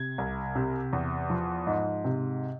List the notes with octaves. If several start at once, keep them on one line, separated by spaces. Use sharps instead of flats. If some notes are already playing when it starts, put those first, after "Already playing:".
Already playing: C3 G#6
C2
C3
E2
F3
G#2
C3